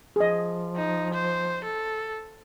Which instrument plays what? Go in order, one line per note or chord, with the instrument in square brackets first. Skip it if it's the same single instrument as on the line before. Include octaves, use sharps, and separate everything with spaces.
[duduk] F3 [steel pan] G#4 D#5
[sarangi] D#4
C5
A4